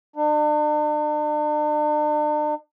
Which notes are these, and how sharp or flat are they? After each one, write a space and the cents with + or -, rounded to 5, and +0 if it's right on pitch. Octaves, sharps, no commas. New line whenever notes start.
D4 +40